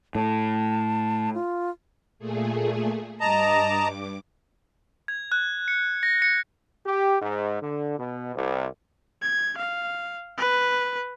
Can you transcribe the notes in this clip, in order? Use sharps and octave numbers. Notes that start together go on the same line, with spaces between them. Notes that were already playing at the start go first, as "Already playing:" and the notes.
A2 A5
F4
A#2 A3 G#4
G2 D#5 A5 A#5 D6
G#6
F#6
C#7
A#6
C#7
G4
G#2
D3
B2
C2
G#6
F5
B4